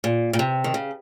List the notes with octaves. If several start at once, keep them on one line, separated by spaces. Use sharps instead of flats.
A#2
A#2
C3
D#3
C#3